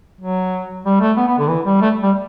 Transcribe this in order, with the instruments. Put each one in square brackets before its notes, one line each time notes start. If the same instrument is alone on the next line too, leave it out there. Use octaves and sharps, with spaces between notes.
[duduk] F#3
G3
A3
B3
B3
D3
E3
G3
A3
G3